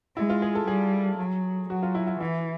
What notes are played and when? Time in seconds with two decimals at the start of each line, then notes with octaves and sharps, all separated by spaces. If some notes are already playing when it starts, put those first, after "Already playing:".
0.17 G#3 E4
0.30 F4
0.42 G#4
0.55 A4
0.68 G3 G#4
1.19 F#3
1.69 F#3 F#4
1.83 F4
1.95 E4
2.07 E4
2.20 E3 E4